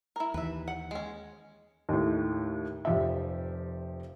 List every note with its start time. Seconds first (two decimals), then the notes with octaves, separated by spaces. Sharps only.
0.16 E4 A#4
0.34 D#2 E3 B4 E5
0.68 F#5
0.91 G#3 C#4
1.89 D#2 A2
2.85 F1 F3 G4 E5